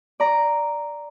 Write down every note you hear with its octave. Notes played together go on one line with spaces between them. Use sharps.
D5 A#5